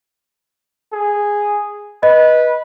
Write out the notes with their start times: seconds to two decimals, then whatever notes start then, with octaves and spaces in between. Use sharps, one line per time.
0.93 G#4
2.03 B4 D#5